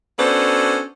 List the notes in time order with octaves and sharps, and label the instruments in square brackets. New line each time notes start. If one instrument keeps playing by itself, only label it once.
[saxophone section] B3 C#4 D4 F#4 A4 C5